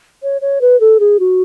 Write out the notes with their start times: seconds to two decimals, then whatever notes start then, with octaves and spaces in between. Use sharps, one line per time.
0.23 C#5
0.41 C#5
0.61 B4
0.80 A4
1.00 G#4
1.20 F#4